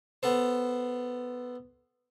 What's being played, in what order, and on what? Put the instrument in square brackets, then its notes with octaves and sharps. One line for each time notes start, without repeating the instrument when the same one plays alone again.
[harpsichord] B3 A4 C5